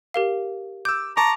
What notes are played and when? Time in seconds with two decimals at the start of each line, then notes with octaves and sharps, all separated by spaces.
0.14 G4 A#4 F5
0.85 D6 E6 G6
1.17 A5 A#5 C#6 D6